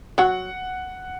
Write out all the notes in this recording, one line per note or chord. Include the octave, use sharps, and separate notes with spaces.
F#3 F#4 F#5